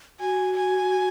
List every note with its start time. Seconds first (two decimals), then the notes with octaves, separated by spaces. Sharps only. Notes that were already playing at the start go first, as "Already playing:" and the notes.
0.20 F#4 G#5
0.57 G#5